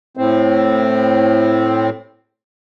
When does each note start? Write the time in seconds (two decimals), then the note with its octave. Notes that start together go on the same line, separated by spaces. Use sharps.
0.17 A2 C4